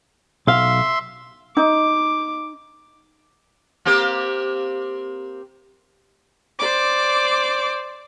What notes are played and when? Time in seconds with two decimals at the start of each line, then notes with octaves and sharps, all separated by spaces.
0.47 B1 E5 F5 C6
1.57 D#4 D6
3.85 A#3 C4 G4
6.59 C5 D5 D6